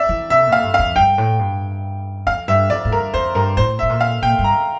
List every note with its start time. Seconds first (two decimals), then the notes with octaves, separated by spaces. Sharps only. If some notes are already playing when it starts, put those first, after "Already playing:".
Already playing: D5 E5
0.09 E3
0.30 C3 E5
0.47 A#2
0.52 F5
0.64 G2
0.74 F5
0.79 F2
0.96 G2 G5
1.18 A2
1.39 G2
2.26 F2 F5
2.48 G2 E5
2.70 F2 D5
2.85 A2
2.92 G2 A#4
3.14 F2 C5
3.35 G2 A#4
3.57 A2 C5
3.79 E5
3.83 A2
3.89 A#2
4.01 F5
4.22 A#2 G5
4.39 G2
4.44 A#5